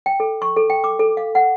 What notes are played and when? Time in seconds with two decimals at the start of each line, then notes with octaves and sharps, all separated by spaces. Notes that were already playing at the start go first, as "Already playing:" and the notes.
0.06 G5
0.20 A4
0.42 C#6
0.56 A4
0.70 G5
0.84 D6
0.99 A4
1.17 F5
1.35 F#5